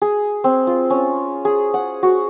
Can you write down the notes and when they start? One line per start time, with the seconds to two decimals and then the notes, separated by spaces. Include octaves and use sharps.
0.02 G#4
0.44 C4
0.67 F4
0.90 C#4
1.45 G#4
1.74 F#5
2.03 F#4